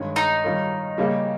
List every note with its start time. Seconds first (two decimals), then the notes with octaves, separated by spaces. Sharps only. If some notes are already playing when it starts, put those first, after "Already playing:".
Already playing: G2 D#3 G#3 C#4 G#4
0.16 D#4
0.44 D#3 G3 C#4 F4 A#4
0.97 C#3 G3 A#3 C#4 G4